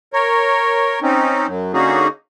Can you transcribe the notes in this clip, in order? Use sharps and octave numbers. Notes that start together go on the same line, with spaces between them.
A#4 C#5
C4 C#4 D#4
F#2 F#3
D3 A#3 C#4 D#4 F#4 G#4